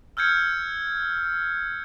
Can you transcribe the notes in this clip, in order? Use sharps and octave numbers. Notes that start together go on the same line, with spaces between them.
E6 F6 G6 G#6 C#7